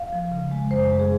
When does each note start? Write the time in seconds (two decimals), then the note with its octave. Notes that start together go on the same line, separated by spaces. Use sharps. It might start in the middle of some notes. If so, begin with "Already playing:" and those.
Already playing: F5
0.13 F3
0.32 C#3
0.51 G#3
0.71 F#2 C5
0.90 G#3
0.99 G#4